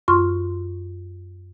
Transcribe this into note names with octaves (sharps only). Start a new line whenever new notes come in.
F#2 F4 C6 C#6 F6